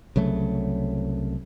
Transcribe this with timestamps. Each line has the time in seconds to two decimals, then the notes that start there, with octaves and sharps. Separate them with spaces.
0.16 C2 C#3 F#3 A3